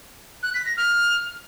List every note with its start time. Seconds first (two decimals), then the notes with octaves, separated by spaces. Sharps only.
0.43 F#6
0.54 B6
0.66 A#6
0.77 F6